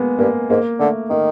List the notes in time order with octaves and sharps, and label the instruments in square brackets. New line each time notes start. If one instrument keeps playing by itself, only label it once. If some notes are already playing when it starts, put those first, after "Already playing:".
Already playing: [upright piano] G#3 A#3 B3
[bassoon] G2 [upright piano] A#3
[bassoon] G#2 [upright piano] A#3
[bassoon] D3 [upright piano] A3
[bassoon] D#3 [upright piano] A#3